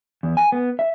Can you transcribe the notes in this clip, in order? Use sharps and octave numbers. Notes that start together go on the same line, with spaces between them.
E2
G#5
B3
E5